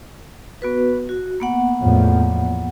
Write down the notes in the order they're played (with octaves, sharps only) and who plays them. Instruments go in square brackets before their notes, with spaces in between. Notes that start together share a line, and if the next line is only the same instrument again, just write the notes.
[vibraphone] B3 F#4 B4
F#4
A#3 B3 F#5
[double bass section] E2 A2 F3